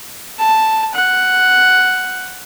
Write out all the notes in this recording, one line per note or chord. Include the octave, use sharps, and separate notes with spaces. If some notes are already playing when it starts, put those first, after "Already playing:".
A5
F#5